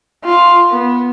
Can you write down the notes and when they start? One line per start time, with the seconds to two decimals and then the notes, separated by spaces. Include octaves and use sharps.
0.24 F4
0.71 B3